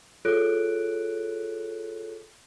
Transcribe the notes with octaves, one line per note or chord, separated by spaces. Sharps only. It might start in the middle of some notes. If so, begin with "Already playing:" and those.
F4 G#4 A4 C#5 F#6 D7